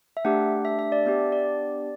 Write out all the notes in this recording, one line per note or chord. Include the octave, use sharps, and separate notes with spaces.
E5
A3 D4 G4 F#5
E5
E5
D5
B3 D4 G4 E5
D5
D5